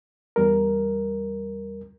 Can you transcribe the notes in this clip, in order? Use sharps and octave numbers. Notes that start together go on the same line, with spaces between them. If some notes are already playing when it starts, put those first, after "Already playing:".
E2 G3 A#4